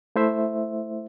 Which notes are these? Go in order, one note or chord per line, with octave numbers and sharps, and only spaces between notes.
A3 E4 C5 E5